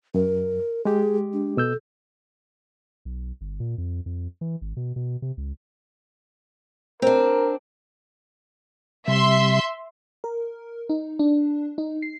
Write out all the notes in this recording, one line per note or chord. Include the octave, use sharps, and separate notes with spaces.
F#2 A#4
G#3 G4 G#4
D4
B2 A4 E6 G6
B1
G1
A#2
F2
F2
E3
G#1
B2
B2
C3
C#2
C4 D4 A#4
C3 G3 E5 C6
A#4
D#4
D4
D#4
C7